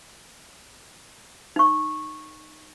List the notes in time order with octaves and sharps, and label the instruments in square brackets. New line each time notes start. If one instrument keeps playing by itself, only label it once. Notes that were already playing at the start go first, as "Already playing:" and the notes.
[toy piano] D#4 C#6